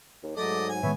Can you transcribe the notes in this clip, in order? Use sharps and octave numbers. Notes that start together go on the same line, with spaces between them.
D#2
G#2 F#3 A3 D5 D#5
G#5
A2 D#3 G#3 B3 C#5 E5